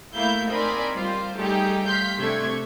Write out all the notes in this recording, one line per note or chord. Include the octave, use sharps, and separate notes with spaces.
A3 A#3 E4 E5 F5 G6
C4 D#4 A#4 D5 G#5 B5
G3 F4 C5
G3 A3 D#4 G4 G#4
F5 C6 G6 B6
C3 A3 D4 C#6 G#6